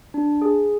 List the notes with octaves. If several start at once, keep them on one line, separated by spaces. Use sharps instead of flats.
D4
G#4